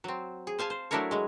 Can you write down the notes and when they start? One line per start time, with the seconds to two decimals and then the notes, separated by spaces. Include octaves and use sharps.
0.04 F#3 C4
0.47 G#4
0.59 C5 F5 G#5 A5
0.70 C5
0.91 F#3 A3 D4 E4 A#4 C#5
1.11 F#3 G#3